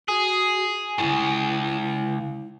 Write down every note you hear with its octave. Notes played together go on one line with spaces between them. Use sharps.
F#4 G#4
C#2 G2 E4